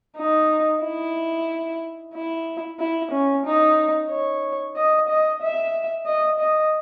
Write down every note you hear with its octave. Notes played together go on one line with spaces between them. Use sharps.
D#4
E4
E4
E4
C#4
D#4
C#5
D#5
D#5
E5
D#5
D#5